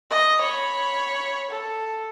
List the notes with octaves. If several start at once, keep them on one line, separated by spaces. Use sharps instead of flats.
D#5
C#5 B5
A4